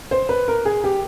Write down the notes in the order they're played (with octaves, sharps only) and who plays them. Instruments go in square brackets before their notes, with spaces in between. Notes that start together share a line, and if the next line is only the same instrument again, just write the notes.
[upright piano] C5
B4
A#4
G#4
G4